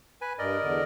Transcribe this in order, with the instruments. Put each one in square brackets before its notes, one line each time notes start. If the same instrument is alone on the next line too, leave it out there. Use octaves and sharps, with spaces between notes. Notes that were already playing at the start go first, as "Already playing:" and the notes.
[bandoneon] B4 G#5
[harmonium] G2 [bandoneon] A#4 D5 D#5
[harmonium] E2 D3